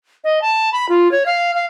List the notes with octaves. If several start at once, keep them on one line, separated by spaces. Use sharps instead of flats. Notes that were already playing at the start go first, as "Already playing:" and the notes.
D#5
A5
B5
F4
C#5
F5
F5